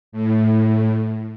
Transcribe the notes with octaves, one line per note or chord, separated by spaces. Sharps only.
A2